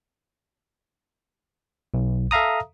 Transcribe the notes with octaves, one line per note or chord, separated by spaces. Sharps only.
B1
A4 E5 F5 A#5 D#6